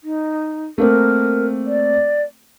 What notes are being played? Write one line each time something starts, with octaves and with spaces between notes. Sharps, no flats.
D#4
A3 A#3 C4 A#4
D5